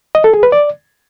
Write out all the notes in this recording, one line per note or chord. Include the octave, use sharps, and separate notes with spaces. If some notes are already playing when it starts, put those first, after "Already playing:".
D#5
A4
G#4
B4
D5